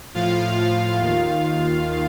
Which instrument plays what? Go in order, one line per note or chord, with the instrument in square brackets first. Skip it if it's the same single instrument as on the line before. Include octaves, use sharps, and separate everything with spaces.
[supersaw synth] A2 F3 F4 F5
D#2 D#3